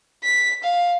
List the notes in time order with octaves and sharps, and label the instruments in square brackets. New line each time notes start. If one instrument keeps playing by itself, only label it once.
[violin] B6
F5